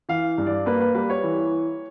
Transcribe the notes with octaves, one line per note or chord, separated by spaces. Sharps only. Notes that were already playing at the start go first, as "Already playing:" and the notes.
E3 F5
G2
D5
A#3 B4
B4
G3 B4
C#5
E3